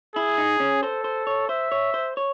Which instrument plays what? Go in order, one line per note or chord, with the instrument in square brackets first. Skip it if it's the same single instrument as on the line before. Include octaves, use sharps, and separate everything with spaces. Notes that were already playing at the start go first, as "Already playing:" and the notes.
[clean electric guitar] E4 [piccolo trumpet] G#4
[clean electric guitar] D#4
C#4
[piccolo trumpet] A4 [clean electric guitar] C5
[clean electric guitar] C5
C#5
[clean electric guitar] C5 [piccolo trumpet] E5
[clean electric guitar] C#5
C5
C#5